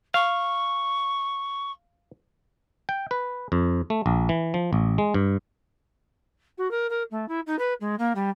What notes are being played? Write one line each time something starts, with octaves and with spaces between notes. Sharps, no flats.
F5 C#6
G5
B4
F2
A3
A#1
E3
F3
A1
G#3
G2
F#4
A#4
A#4
A3
E4
D#4
B4
G#3
A#3
G3